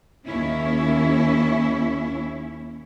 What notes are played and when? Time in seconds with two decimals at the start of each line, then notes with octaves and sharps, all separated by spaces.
0.26 D#2 C#4 E4